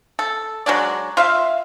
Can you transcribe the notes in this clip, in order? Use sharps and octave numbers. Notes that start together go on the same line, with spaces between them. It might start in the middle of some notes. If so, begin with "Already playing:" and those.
A4
F#3 G#3 D4 D5
F4 E5 F5